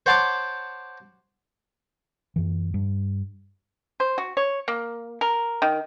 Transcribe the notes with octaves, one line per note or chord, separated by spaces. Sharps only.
C5 C#5 F#5 A5 C6 D6
F#2 E3
G2
C5
F#4
C#5
A#3
A#4
D#3